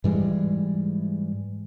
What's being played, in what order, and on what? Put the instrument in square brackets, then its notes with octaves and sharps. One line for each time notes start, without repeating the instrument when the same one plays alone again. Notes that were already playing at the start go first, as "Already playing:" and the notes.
[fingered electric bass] G#2 E3 G3 G#3